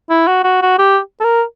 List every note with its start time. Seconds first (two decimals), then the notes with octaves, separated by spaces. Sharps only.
0.10 E4
0.28 F#4
0.44 F#4
0.62 F#4
0.79 G4
1.20 A4
1.24 A#4